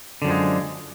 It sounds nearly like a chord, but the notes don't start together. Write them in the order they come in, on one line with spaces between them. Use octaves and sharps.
D3 F#2 F3 G#3